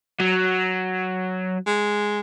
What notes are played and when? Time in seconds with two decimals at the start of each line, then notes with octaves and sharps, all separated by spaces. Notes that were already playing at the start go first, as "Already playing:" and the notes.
0.20 F#3
1.67 G#3